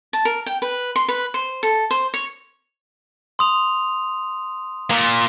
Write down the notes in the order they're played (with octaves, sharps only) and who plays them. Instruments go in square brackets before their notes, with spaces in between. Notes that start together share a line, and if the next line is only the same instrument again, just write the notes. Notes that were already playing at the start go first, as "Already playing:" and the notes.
[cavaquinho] A5
A#4
G5
B4
C6
B4
C5
A4
C5
C#5
[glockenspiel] C6 D#6 F7
[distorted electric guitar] A#2